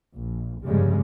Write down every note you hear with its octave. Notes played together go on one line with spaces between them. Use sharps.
A#1
F1 G2 C#3 G3 G#3